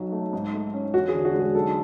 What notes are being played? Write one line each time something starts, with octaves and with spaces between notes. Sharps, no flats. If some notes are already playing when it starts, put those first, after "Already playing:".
Already playing: B1 F#3
A3
G#2
A3
C#4
E1 F#4
G#4
D3
F#4
G#3
G#4
B1 A4